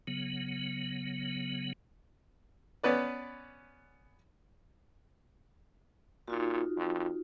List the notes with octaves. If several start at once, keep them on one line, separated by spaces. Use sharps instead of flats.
C#3 F#3 B3
B3 C#4 B4 D5
A#2 D#4 F4 F#4
F2